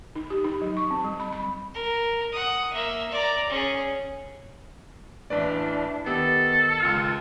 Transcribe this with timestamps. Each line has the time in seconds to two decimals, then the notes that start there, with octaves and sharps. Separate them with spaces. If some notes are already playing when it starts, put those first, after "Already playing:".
0.15 D#4
0.30 G4
0.44 D#4
0.61 F#3
0.77 C#6
0.91 C4
1.04 G3
1.20 B5
1.33 B5
1.74 A#4
2.32 F#5 D#6
2.73 A#3 E5
3.11 D5 A#5
3.50 C#4 G#4
5.30 A1 D4 E4 B4 D5
6.06 D#3 B3 G4 A4
6.80 C#2 F4 F6